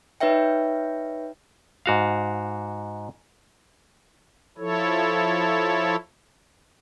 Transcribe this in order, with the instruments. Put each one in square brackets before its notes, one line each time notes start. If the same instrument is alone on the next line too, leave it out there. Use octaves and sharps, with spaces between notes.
[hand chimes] D#4 B4 C#5 E5 G5
[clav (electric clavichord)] G#2 F#4 F5
[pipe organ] F3 E4 A4 C#5